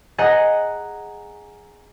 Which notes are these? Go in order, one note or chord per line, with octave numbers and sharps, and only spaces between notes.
G#4 D#5 F#5 A#5